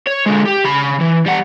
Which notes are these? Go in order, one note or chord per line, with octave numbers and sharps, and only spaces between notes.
C#5
D3 G#3
G4
C#3 B5
E3
G3 F#5